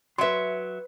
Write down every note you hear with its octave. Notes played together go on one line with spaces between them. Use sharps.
F#3 B4 E5 C6